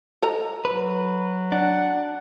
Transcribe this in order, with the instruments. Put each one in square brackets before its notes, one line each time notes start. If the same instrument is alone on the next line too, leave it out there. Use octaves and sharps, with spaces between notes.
[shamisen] A4 D#5 A#5
[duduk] F#3 [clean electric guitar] B4
[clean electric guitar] D4 [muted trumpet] F#5